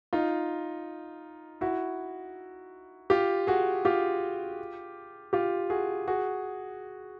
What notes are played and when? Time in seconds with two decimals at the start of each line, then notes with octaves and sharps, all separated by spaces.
0.13 D#4 F4
1.61 E4 F#4
3.10 F4 G4
3.47 F#4 G#4
3.85 F4 G4
5.33 F4 G4
5.70 F#4 G#4
6.08 F#4 G#4